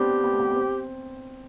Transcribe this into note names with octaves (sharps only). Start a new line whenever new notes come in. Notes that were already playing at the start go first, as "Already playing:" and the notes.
Already playing: B3 C4 D4 G4
B3
A3
B3
B3
C4